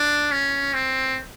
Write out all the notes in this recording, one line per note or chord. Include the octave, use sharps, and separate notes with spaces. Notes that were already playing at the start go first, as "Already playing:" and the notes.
Already playing: D4
C#4
C4